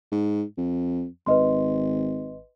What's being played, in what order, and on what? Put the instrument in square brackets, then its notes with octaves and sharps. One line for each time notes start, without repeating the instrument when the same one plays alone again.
[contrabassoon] G#2
F2
[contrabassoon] G#1 [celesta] B4 D#5 C6